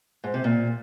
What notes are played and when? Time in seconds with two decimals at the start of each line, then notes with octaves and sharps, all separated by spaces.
0.24 G#2
0.34 C3
0.44 A#2